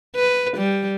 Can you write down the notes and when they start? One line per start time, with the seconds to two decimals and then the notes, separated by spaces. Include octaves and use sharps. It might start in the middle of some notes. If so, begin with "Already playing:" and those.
0.15 B4
0.57 G3